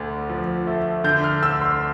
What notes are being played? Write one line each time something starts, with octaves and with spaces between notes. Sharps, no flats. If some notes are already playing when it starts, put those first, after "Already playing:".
Already playing: D2 D3
F3
A3
D3 G6
F6
D2 E6
C6